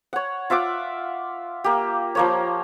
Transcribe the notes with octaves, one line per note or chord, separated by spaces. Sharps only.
C#5 F#5
F4 E5 F#5 D6
A#3 G4
F3 A#3 C#5